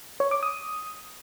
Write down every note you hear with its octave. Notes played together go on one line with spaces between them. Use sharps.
C#5
D6
D#6